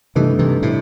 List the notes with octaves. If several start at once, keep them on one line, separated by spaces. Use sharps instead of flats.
G2 C3 D#3 E3 A3 D#4 A4
C3 E3
A2 C3